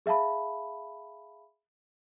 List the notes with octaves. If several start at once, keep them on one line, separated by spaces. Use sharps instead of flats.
G#4 E5 F5 A5 B5